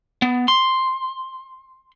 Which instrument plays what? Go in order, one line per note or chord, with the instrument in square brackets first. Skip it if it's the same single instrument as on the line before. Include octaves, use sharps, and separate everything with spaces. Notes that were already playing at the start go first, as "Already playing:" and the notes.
[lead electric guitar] B3
C6